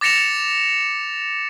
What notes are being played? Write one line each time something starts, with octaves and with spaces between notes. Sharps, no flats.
D6 A6 A#6 C#7 E7 F7